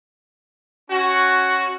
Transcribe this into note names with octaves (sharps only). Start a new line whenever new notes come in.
C#4 F#4